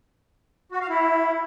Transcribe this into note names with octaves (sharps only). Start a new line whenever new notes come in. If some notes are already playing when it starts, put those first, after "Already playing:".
F#4
F5
E4